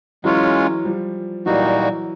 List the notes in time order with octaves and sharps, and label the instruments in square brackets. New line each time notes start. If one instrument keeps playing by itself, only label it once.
[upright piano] E3 F#3 [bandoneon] G#3 C#4 F4
[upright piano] F3 G3
[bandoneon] A#2 G3 A#3 D#4 F#4 [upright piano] E3 F#3